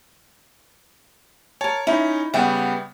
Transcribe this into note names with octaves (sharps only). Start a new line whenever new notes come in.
A#4 C#5 A5
C#4 D#4 E4
C#3 G3 B3 E5 F#5 G5